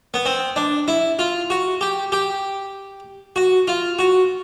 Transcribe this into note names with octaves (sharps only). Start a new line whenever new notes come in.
B3
C4
D4
E4
F4
F#4
G4
G4
F#4
F4
F#4